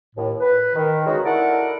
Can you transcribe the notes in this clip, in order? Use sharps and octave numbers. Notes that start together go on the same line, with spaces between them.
D#2 A2
B4
D#3
C#3 G#3 D#4 F#4
E4 A4 A#4 D5 F#5